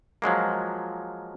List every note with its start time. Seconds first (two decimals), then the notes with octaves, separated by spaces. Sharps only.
0.22 F3 F#3 G#3 A#3